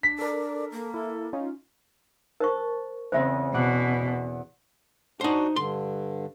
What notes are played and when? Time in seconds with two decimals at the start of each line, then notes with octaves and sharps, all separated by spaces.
0.03 D4 B6
0.19 A4 A#4 D5
0.72 A#3
0.94 E4 A4
1.33 C#4 D#4 F4
2.40 A#4 C5 A5 C#6
3.12 E2 C#3 C4 C5 E5
3.54 E2 B2 F#5 D6
5.21 D4 D#4 F#4 C5
5.56 G2 D3 C6